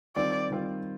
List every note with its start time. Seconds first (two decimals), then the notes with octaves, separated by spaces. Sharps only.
0.16 D#3 G3 C4 F4 D5
0.51 D#3 G3 C4 F4